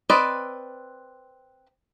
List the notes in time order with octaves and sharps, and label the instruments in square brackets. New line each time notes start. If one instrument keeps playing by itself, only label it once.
[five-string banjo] C4 B4 D5 D#5